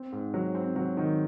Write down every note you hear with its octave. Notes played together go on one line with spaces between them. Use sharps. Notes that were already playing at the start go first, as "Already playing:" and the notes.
Already playing: C4
G#2
F#3
C4
F#3
D#3